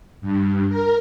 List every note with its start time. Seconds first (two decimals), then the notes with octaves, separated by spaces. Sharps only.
0.21 G2
0.68 A#4